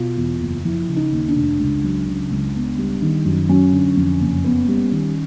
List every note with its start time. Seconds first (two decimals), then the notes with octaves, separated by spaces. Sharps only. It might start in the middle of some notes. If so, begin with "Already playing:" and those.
Already playing: B2 F4
0.17 E2
0.41 F#1
0.65 F3 E4
0.89 C#3
0.96 D#4
1.12 D#2
1.28 D4
1.36 F1
1.59 C#2
1.84 F#3
2.07 C#3
2.31 C#2
2.55 B3
2.78 G3
3.02 D#3
3.25 F#2
3.49 F#3 C#4
3.73 D3
3.97 F2
4.20 F#1
4.44 B3
4.68 G3
4.92 D#3